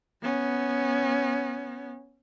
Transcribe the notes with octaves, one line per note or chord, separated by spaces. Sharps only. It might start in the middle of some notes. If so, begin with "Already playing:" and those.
B3 C#4